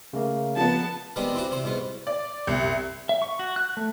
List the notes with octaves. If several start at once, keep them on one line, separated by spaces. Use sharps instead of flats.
C#3 A3 A#3
F3 B3 A5
D#3 G3 G#3 B3 C4 D4
E3 C4 D4 F#4
C3 C5
C2 G#2 B2 B3
D5
C2
E5
C#6
F#4
F#6
A3